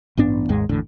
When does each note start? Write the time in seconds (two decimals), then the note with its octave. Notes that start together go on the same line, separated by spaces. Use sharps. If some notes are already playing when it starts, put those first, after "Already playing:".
0.17 A1 G2 B3 D4
0.49 G#1 D#2 G#2 G#3
0.69 G#1 E2 A2 D3